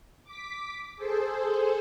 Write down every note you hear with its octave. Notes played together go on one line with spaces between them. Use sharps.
D6 B6
G#4 A4 C5